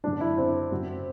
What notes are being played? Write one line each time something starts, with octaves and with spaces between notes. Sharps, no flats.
F#1 F#2 D3 F#3 D4
E4
C4
F#1 F#2 F#3